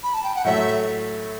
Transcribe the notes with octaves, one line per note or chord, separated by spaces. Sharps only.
B5
A5
G5
F#5
A2 F#3 A3 E5